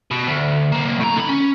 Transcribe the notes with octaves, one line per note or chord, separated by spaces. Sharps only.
B2
D2
B1 A#3
A2 A#5
D3 B5
C#4